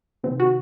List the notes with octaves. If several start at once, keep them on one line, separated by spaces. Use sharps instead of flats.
C3 D#3 C4
F#4